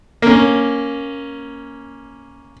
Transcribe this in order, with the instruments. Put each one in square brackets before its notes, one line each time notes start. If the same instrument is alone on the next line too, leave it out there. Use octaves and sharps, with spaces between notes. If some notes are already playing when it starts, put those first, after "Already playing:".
[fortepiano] A#3 C#4